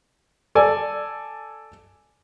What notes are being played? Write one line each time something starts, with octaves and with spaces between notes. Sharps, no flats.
A4 D5 G#5